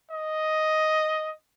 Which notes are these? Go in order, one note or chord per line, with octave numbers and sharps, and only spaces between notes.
D#5